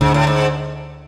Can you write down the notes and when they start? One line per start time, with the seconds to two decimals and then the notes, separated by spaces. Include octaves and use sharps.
0.01 D2 G#2 D3
0.14 A2
0.27 G#2